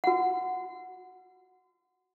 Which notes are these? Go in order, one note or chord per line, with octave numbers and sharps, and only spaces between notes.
F#4 F#5